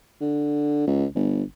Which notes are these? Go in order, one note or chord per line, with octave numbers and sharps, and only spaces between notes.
D3
C#2
G1